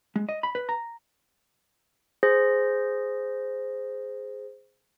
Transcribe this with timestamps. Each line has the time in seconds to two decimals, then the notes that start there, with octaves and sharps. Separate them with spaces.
0.16 G#3
0.29 D#5
0.43 B5
0.55 B4
0.69 A#5
2.23 G#4 C5 A#6